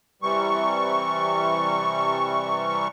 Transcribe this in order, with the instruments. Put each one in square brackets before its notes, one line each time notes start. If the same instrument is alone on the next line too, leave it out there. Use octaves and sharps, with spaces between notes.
[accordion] C3 E3 G3 C#6